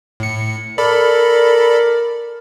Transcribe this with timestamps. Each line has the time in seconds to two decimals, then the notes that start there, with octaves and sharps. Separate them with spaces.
0.20 A2 C#7
0.78 A4 A#4 D5 B5